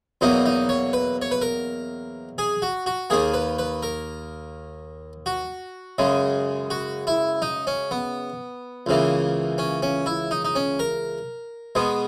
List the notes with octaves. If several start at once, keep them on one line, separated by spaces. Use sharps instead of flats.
E2 B2 F#3 A#3 D#4
D#4
C#5
B4
C#5
B4
A#4
G#4
F#4
F#4
D#2 D#3 A#3 G#4
B4
B4
A#4
F#4
F#2 C#3 G#3
F#4
E4
D#4
C#4
B3
C#2 C#3 E3 A#3
C#4
C#4
E4
D#4
D#4
C#4
A#4
B2 G#3 B3